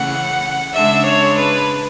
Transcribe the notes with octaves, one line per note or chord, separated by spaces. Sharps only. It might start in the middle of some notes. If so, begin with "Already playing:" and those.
Already playing: C#3 E3 A3 C#4 F#5
C#3 G#3 D4 E5
C#5
B4